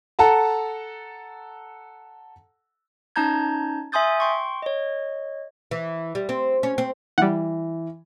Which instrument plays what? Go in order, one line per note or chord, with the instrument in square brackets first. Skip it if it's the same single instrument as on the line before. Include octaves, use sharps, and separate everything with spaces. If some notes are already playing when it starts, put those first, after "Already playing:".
[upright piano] A4 F#5 A5 A#5
[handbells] C#4 D#4 A5 A#5 G6 G#6
E5 G#5 C6 D#6 G6 A6
G5 C6 C#6
C#5 D#5
[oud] E3
G3
C4
C#4
C4
[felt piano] E3 [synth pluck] G3 F#5